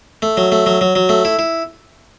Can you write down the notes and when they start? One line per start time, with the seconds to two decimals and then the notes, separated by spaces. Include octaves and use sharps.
0.22 A3
0.37 F#3
0.52 A3
0.66 F#3
0.81 F#3
0.95 F#3
1.09 A3
1.25 E4
1.39 E4